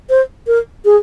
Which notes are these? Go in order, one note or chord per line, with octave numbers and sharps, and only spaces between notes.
C5
A#4
G#4